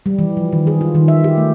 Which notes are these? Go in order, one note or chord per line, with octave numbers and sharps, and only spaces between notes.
G3
E3
F3
D#3
G#4
F4
D#3
E5
G4
A3